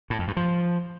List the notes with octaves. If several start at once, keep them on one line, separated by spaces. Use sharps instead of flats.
A2
F2
G2
F3